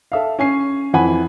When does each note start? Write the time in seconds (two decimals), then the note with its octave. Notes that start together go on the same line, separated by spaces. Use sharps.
0.12 A4 E5 F5
0.39 C#4 G#5 C7
0.93 F2 E3 F#5 G#5 B5